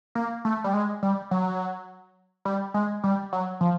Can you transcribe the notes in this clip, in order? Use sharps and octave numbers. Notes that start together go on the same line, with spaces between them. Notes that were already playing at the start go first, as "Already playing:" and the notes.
A#3
A3
G3
G#3
G3
F#3
G3
G#3
G3
F#3
F3